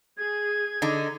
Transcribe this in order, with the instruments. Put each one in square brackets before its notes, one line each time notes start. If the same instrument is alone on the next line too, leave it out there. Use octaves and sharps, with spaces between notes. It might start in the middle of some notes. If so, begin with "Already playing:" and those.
[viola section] G#4 [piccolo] G#6
[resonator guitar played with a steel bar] D3 D#4